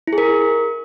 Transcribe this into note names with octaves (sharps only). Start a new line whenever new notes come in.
E4
G#4
A#4